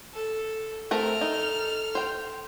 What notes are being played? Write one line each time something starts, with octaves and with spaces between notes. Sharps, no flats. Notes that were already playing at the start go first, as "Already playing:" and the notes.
A4
A3 C4 A4 A#4 F6
D#4
C5 G5